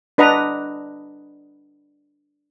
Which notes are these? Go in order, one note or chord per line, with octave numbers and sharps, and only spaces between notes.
D4 B4 D#5 F#5 A#5